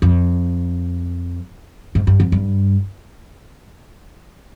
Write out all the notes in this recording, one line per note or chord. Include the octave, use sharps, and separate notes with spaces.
F2
G#2
G2
F2
G2